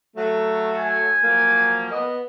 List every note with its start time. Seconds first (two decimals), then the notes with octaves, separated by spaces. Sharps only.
0.17 F#3 A3
0.78 G#5
1.23 F3 F#3 A#3
1.92 B3 D#5